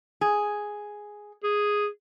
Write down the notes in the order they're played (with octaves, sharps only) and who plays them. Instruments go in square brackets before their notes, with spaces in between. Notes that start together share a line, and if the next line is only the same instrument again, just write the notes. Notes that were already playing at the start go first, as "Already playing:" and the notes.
[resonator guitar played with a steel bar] G#4
[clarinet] G#4